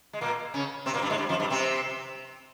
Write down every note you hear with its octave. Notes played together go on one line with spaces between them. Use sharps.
G#3
A#2 A#3
C#3 C#4
C3 C4
A#2 A#3
G2 G3
G#2 G#3
G2 G3
F2 F3
G2 G3
C3 C4